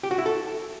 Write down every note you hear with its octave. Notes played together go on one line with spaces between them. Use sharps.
G4
F#4
E4
A4